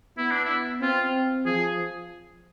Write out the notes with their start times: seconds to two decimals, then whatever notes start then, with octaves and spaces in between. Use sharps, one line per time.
0.18 B3 E4
0.31 D4
0.45 E4
0.81 C4 F4
1.46 F3 G#4